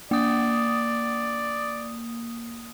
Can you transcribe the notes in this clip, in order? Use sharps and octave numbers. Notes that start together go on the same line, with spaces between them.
A#3 D5 D#6